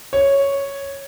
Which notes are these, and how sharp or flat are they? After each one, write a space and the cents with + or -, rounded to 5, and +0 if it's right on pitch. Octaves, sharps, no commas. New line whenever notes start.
C#5 +0